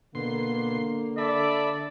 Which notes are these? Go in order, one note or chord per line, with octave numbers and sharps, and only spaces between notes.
B2 D3 A#3 C6
A4 D5 E5 B5